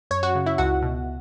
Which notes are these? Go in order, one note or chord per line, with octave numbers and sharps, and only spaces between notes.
F#2 C#5
F#4 F#5
C#3
E4 E5
C#2 F#4 F#5
B2